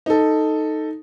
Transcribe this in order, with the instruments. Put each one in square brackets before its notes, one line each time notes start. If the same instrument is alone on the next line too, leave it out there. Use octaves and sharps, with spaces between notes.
[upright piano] D#4 A4